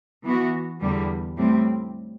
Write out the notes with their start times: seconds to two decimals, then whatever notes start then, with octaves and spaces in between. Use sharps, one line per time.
0.24 E3 B3 F#4
0.81 E2 D3 G3
1.37 A2 G3 C4